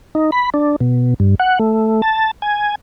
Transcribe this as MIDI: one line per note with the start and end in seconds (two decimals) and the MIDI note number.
0.15 0.31 63
0.32 0.50 83
0.54 0.76 62
0.80 1.14 47
1.20 1.35 43
1.40 1.59 78
1.59 2.02 57
2.02 2.31 81
2.42 2.75 80